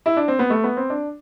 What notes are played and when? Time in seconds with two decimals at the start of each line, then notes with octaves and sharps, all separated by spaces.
0.06 E4
0.17 D4
0.28 C4
0.39 B3
0.50 A3
0.64 B3
0.77 C4
0.90 D4